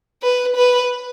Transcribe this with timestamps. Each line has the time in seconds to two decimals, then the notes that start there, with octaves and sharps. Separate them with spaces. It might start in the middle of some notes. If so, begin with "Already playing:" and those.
0.23 B4
0.56 B4